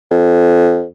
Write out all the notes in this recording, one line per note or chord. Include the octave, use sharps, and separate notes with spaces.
F2